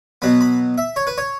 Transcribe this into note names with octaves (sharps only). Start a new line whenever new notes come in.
B2 F#3 B3 B5
B5
E5
C#5
B4
C#5